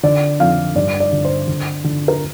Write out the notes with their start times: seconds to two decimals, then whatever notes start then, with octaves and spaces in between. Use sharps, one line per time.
0.03 D3 D5
0.39 F2 F5
0.75 G2 D5
1.00 D5
1.12 D3
1.25 C5
1.48 D3
1.84 D3
2.08 A#4